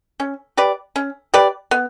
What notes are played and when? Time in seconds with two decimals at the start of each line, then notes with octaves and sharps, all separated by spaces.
0.20 C#4
0.57 G4 B4 D5
0.96 C#4
1.34 G4 B4 D5
1.71 B3